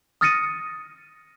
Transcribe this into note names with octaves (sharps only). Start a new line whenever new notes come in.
D#6 F6 A6 A#6 C#7 D#7